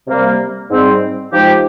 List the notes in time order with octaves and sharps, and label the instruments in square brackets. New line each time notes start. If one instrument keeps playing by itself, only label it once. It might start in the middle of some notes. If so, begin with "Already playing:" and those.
[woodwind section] C3 G3 A#3
G#2 G3 C4
F3 G#3 D#4 G4